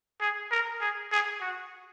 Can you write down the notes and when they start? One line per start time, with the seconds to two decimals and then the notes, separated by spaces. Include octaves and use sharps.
0.21 G#4
0.51 A#4
0.81 G#4
1.11 G#4
1.41 F#4